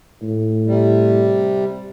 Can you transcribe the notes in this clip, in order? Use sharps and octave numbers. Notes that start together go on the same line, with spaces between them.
A2
C3 G3